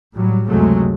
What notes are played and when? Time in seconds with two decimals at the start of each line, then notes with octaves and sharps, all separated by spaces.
0.15 A2 F#3 G3
0.49 C#2 F#2 C3 F#3 G#3 A3